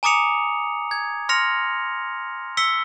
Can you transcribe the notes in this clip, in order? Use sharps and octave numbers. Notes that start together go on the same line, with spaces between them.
G#5 A#5 D6 D#6 C#7 F7
G#6
C6 F6 A#6 C#7 F7
E6 B6 C#7 G7